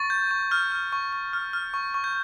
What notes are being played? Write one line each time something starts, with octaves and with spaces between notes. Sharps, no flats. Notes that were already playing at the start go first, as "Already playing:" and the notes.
Already playing: C#6 A6
G6
C#6
F6 G6
F6
C#6
C#6
F6
F6
C#6
C#6
G6